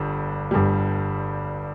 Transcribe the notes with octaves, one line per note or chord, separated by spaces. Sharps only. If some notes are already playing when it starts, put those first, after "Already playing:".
Already playing: G1 G2
G1 G2 G3